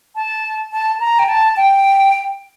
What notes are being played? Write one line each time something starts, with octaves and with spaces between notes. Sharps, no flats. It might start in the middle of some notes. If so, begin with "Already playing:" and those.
A5
A5
A#5
G5
A5
G5